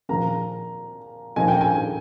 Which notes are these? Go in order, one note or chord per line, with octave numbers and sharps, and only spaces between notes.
A#2 F3 A#3 A#5
A#2 F3 A#3 D#4 G#5
G5
G#5